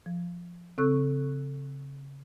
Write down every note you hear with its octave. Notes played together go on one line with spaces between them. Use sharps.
F3
C#3 C4 A4 C#6 E6 F#6